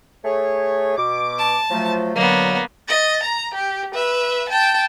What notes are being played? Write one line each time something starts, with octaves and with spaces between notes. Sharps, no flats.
A3 G#4 C#5
B2 D6
A5
F3 F#3 A3
B2 D3 F#3 A#3 B3
D#5 A6
A#5
G4
B4 E5
G5 A5